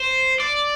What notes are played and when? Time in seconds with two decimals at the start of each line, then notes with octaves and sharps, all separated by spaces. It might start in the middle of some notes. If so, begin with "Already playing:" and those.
Already playing: C5
0.40 D5